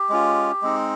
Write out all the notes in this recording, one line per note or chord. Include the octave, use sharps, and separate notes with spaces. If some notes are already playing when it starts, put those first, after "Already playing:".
Already playing: G4
G#3 C#4 F4
G#3 C4 D#4